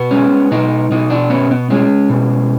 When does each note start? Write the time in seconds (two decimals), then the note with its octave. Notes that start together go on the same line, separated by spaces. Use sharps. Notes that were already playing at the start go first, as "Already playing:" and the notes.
Already playing: B2 B3
0.11 G#3 C#4
0.51 B2 D#4
0.91 B2 D#4
1.10 D4
1.30 B3 C#4
1.51 B3
1.70 G#3 C#4
2.10 B2